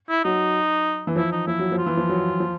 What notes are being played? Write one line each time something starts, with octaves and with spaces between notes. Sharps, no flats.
E4
F#3 D#4
E3
F3 E4
D#4
F3 E4
F#3
F3
F4
E3
F3
F#3
F3